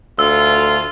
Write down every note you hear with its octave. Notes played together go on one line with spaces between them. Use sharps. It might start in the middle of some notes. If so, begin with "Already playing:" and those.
D2 F4 E6